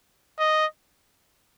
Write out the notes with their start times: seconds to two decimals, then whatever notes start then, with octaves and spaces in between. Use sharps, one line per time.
0.39 D#5